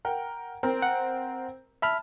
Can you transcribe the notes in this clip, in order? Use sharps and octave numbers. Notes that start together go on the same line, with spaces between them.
A#4 F#5 G5
C4 A#4
F#5
E5 A5 B5 F6